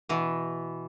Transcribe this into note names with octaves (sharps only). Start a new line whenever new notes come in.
B2 E3